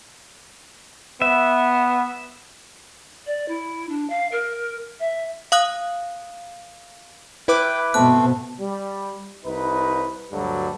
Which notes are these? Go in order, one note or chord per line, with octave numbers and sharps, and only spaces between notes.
B3 E5
D5
E4
D4
F5
A#4
E5
F5 D#6 F#6
E4 B4 G5 D6
B2 A3 C4 F#6
G3
C2 D#4 B4
D2 G2 F#3 G3 A4